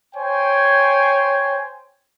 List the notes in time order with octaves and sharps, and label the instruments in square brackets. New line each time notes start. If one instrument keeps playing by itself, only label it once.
[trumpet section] C5 C#5 G5 G#5